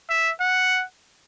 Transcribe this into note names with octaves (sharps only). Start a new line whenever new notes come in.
E5
F#5